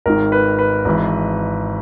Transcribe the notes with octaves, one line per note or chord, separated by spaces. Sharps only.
G#1 G#2 D#3 A#4
B4
B4
G#1 G#2 E3